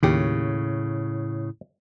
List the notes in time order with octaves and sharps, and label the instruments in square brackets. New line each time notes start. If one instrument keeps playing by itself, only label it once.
[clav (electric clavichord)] D#2 G4 [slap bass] A2 C#3